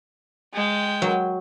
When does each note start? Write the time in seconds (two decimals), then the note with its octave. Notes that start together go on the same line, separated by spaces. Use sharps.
0.54 G#3 G5
1.02 F#3